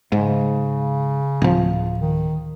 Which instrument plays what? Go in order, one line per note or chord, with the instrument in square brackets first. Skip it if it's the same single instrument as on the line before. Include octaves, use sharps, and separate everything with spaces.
[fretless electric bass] G#2 [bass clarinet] C#3
[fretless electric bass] D1 F3
[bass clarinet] D#3